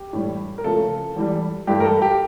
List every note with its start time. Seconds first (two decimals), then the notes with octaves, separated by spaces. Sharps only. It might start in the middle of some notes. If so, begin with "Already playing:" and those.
Already playing: G4
0.13 A2 E3 G3
0.58 A#4
0.64 C#3 F3 A3 A4
1.16 E2 E3 G3
1.67 G2 E3 A3 G4
1.80 A#4
1.84 A4
2.02 G4